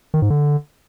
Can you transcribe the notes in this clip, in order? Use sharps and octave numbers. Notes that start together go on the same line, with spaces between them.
D#3
G#2
D3